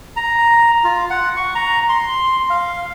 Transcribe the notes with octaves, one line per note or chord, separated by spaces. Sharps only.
A#5
F4
F#5
C#6
A#5
C6
F5